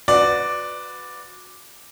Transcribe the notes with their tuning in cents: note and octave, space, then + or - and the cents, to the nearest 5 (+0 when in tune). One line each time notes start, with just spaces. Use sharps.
F#4 -20 B4 +5 D5 +0